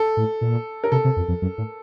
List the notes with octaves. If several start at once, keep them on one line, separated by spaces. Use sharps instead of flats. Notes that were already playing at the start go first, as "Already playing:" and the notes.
Already playing: A4
A2
A#2
A#4
C3 A4
C3
F2
F2
F#2
A2